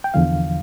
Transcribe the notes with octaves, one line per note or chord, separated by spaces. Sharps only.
G5
E2 D3 F3 F5